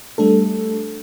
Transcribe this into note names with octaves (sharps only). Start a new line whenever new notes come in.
G3 A3 D4 A4